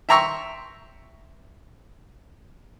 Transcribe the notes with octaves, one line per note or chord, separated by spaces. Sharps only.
E5 G5 A#5 C6 C#6 E6